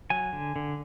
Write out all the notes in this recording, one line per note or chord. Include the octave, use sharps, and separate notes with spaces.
F#3 G#5
D3
D3